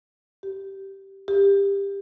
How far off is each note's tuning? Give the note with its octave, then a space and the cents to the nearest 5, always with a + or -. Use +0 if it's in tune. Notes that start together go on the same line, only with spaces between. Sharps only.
G4 -10
G4 +20